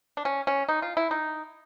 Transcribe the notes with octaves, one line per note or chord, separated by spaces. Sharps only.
D4
C#4
C#4
D#4
F4
E4
D#4